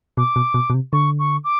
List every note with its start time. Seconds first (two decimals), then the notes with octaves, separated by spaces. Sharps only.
0.17 B2 D6
0.36 B2
0.54 B2
0.70 B2
0.74 C3
0.92 D3 C#6
1.19 C#6
1.44 D6